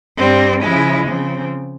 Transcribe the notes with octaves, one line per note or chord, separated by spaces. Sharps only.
G2 G3 C4
C#3 F3 G#3 E4
C#3 F3 C4